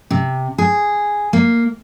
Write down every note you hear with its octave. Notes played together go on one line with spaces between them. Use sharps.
C3
G#4
A#3